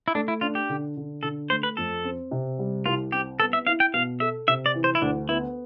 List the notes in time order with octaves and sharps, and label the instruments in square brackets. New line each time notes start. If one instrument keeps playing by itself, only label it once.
[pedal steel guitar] E4
[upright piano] A3 [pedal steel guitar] D4
[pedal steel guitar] E4
[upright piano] D4 [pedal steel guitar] F4
[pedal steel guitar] G4
[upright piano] D3
D3
[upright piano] D3 [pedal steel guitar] A4
[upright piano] A3 [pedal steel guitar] C5
[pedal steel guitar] B4
[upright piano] F2 [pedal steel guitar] A4
[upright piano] C4
C3
G3
[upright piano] C2 [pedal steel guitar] F4
[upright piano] C4 [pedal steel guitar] G4
[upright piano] B3 [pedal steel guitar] A4
[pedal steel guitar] E5
[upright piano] E4 [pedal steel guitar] F5
[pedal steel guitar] G5
[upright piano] B2 [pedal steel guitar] F5
[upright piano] A4 [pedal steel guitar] E5
[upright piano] C3 [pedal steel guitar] E5
[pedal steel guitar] D5
[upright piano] E3
[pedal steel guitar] C5
E4
[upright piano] D2 [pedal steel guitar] D4
[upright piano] B3 [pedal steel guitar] E4